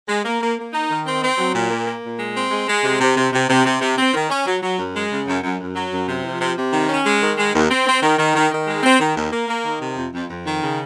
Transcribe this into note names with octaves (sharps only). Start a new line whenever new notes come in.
G#3
A#3
A#3
A#3
D#4
D#3
C4
C4
F#3
A#2
A#3
A#3
A#2
G#3
C4
G#3
G#3
C3
C3
C3
C3
C3
C3
C3
C4
D#3
C#4
F#3
F#3
F#2
G#3
C#3
F#2
F#2
F#2
F#3
F#2
C3
F3
C3
C3
D#3
C#4
G#3
D#3
G#3
D#2
C4
C4
D#3
D#3
D#3
D#3
G#3
C4
D#3
D#2
A#3
A#3
D#3
C3
F2
F2
F2
D#3
C#3